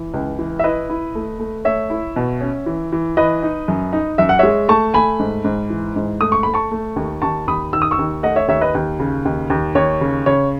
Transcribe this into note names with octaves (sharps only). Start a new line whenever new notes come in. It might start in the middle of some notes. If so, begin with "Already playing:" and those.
Already playing: E3
C#2
E3
E5
E4 B4 D#5
E4
A3
A3
A3 C#5 E5
E4
B2
C#4
E3
E3
E3 B4 D#5
D#4
F#2
D#4
F#2 E5
F#5
G#3 C#5 E5
A3 A5 C#6
A3 G#5 B5
G#2
G#2
E3
G#2
A3 D#6
C#6
A3 B5
A5 C#6
A3
D#2
D#2 A5 C#6
D#2 B5 D#6
D#3 E6
D#6
C#6 E6
D#2
A3 D#5 F#5
C#5 E5
D#2 C#5 E5
B4 D#5
D#2
C#3
D#2
D#2
D#2 C#5
C#3
C#3 C#5